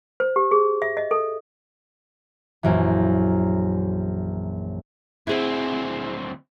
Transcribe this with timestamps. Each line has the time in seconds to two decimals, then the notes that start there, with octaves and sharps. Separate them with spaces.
0.20 C5
0.36 G4
0.51 G#4
0.82 E5
0.97 D#5
1.11 A4
2.63 A#1 F#2 E3
5.27 D2 C4 E4 G#4 F#5